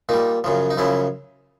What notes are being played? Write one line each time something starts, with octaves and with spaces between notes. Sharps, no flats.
A#2 G3 D#4
F#2 C#3 F3
D#4
F#2 C#3 F3 E4